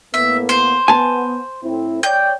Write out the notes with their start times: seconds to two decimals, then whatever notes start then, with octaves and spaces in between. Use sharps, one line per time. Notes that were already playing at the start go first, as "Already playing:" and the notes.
0.14 A2 A#3 B3 E5
0.49 C5
0.88 B3 G#5 A5
1.63 A2 C4 E4
2.03 C#5 D5 G5 G6